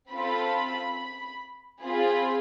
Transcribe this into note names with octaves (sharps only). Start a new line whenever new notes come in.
C4 F4 A4 B5
C4 F4 G#4 B5